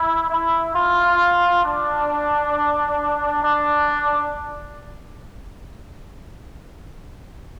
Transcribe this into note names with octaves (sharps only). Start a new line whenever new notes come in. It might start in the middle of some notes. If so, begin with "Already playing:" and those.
Already playing: E4
E4
F4
D4
D4